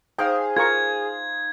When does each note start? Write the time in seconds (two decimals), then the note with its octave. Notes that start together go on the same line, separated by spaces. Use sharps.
0.19 D#4 G#4 C5 F5 G5
0.57 F4 A#4 C#6 G#6